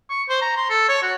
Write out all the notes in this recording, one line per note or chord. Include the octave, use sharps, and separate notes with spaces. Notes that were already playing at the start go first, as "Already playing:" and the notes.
C#6
C5
A#5
C6
A4
C#5
F#4